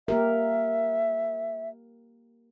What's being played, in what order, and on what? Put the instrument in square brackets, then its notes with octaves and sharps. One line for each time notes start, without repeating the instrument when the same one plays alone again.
[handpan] A#3 G4 A#4 [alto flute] E5